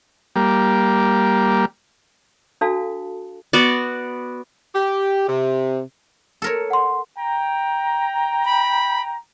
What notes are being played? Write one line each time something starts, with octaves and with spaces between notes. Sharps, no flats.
G3 A#3
D4 F#4 A4 F5 A5
B3 F#4 D5
G4
C3
A4 A#4 C#5
F#5 C6
G5 A#5
B5